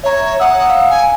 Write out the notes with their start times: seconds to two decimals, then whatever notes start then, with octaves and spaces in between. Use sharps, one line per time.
0.04 C#5 E5 A#5
0.40 F#5 A#5 D#6 E6
0.70 F5
0.91 G#5